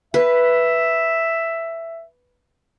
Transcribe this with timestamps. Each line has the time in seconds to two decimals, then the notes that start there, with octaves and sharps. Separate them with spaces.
0.14 B4 E5